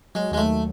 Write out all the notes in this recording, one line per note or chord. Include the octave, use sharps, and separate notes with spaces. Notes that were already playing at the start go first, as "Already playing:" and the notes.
F#3 G#3
D#2 G#3
A3